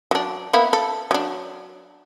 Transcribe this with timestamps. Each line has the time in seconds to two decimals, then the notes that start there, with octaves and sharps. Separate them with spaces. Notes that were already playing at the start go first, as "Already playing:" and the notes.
0.11 F#3 D4
0.53 A#3 B3 E4
0.73 A4
1.11 F#3 D4